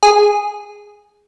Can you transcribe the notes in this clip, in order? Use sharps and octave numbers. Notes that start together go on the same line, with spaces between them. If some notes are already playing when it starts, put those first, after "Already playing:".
G#4